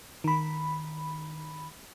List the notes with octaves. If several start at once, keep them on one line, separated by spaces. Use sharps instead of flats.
D#3 B5